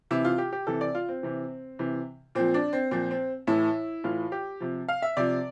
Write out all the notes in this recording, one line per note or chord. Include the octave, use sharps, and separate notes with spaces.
C3 E3 E4
F4
G4
G4
C3 E3 A4
D5
F4
C4
C3 E3
C3 E3
A#2 F3 C4
D4
C4
A#2 F3 C4
C4
A2 E3 E4
A2 E3 F4
G4
C3 F3
F5
E5
C3 F3 D5